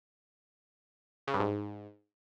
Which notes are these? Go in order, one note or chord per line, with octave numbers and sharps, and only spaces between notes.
C#3
G2
G#2